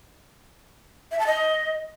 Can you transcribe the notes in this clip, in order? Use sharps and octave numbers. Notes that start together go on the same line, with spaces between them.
E5
A5
D#5